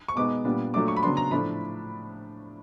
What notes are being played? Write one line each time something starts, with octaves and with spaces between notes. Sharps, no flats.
C#6
B2 G#3 B3 D#4 D6
A#2 G3 B3 D4
A#2 F#3 A3 D4 D6
C#6
B5
C#3 F#3 B3 D4 C6
A#5
A2 F3 A3 D4 B5